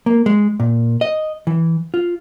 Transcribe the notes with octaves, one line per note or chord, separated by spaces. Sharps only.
A#3
G#3
A#2
D#5
E3
F4